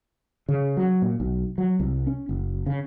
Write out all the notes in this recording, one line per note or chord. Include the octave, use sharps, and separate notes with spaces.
C#3
F#3
A#2
B1
F#3
C2
C#4
F#1
C#3